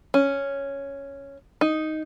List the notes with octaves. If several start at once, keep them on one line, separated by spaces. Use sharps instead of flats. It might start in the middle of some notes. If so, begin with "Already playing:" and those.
C#4
D#4